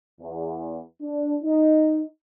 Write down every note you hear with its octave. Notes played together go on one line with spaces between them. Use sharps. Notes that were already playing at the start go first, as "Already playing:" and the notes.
E2
D4
D#4